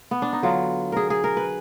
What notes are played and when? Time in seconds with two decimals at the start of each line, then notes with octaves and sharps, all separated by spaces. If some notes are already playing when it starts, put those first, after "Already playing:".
0.11 B3
0.22 D4
0.33 D#4
0.42 D3 F#3 F4
0.92 G#4 A#4
1.10 G#4
1.24 A#4
1.37 B4